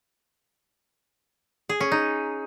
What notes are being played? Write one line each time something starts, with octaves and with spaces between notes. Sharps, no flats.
G#4
C#4
D#4